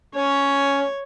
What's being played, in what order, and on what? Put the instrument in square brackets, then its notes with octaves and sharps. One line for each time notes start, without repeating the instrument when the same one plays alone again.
[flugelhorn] C#4 [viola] C#5